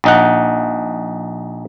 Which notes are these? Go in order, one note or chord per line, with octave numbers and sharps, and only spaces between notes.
A#1 D#4 F#5